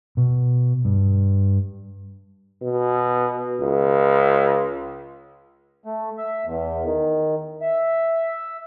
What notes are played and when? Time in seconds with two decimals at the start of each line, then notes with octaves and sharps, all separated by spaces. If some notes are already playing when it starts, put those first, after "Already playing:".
0.17 B2
0.85 G2
2.63 B2
3.60 C#2
5.85 A3
6.18 E5
6.45 E2
6.85 D#3
7.62 E5